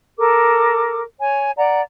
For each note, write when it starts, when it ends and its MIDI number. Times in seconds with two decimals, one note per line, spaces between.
0.18 1.02 69
0.18 1.02 70
0.18 1.02 86
1.20 1.52 73
1.20 1.52 80
1.56 1.81 74
1.56 1.81 78
1.56 1.81 82